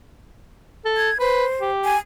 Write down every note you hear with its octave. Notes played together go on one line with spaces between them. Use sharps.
A4
G#6
B4 C5
G4
G#5